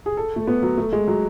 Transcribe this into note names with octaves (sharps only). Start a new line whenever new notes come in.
G#4
A4
A3
B3
F#3
A3
G#3
F#3